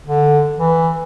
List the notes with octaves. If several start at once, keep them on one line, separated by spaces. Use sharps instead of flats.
D3
E3